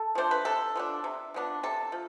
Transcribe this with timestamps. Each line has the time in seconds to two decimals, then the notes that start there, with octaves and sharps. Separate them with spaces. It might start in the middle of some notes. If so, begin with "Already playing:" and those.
Already playing: A4
0.15 F3 A3 D4 C5
0.31 B4
0.45 C3 A4
0.75 F3 B3 D4
1.04 C3
1.34 F3 B3 D4
1.63 C3 A4
1.92 F3